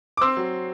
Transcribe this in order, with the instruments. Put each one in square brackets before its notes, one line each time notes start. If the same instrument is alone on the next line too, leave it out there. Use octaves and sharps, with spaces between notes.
[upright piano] D6
C4 C6 E6
F#3